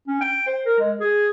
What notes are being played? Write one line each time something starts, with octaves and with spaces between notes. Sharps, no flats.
C#4
G5
C5
A#4
G#3
G#4